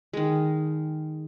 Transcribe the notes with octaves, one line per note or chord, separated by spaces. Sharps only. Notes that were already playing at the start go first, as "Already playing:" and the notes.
D#3 G#3